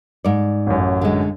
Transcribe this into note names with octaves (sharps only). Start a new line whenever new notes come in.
G#2 D5
A1 F#2
D3 G#3